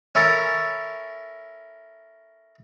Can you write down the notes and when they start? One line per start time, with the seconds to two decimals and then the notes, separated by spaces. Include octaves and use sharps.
0.15 C#4 E4 A4 A#4 A5